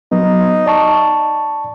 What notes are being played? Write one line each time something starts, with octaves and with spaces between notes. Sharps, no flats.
F#3 B3 D#4
D5 A5 C#6